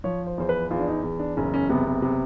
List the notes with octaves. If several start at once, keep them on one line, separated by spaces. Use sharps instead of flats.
F3 C#5
C5
E2 C5
B4
E2 F4
D4
D#4
E2
D4
F#1 C#4
C#4
C3 B3
B3
C3